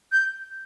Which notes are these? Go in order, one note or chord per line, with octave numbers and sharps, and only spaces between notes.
G6